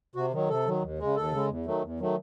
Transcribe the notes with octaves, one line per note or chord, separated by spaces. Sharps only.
C3 F#4
D#3 F#3
C3 A4
D#3 F#3
D#2
C#3 G#3
D#2 A4
C#3 G#3
E2
D#3 F#3 A3
E2
D#3 F#3 A3